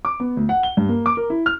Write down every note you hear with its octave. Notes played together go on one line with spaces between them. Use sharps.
D6
B3
D2
F#5
G7
G2
A#3
D6
A#4
E4
F6